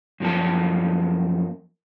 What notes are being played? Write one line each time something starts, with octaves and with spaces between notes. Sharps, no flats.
F#2 F3 A#3 A5